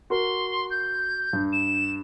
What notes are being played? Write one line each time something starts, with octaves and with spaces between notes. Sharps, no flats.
F#4 A#4 C6
G6
G2
E7